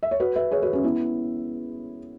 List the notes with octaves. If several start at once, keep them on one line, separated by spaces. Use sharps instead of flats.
E5
C#5
F#4 B4
B4 E5
G#4 C#5
F#4 B4
C#4 F#4
B3 E4